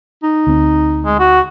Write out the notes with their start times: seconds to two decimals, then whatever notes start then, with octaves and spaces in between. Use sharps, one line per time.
0.23 D#4
0.47 D2 C4
1.05 G#3
1.19 F#4